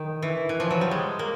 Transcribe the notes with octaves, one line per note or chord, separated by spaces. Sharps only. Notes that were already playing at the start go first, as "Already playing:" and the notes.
Already playing: D#3
E3
E3
F3
F#3
G3
G#3
A#3